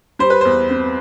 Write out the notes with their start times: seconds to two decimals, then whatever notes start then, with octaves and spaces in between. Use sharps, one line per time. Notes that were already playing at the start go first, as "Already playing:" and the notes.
0.19 G3 C5
0.30 B4
0.41 E2 C5
0.70 C4